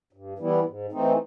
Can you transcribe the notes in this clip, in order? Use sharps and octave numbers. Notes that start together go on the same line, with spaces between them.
G2
E3 G3 B3 E4
G#2
E3 A3 C4 D#4